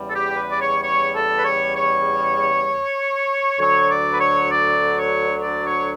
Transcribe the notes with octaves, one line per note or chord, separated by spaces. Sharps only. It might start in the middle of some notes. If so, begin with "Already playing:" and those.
Already playing: E2 C#3 G3
A4
G4
B4
D5
C#5
C#5
A4
B4
C#5
C#5
D2 D3 F#3 C#5
D5
B4
C#5
D5
C#5
C#5
D5
C#5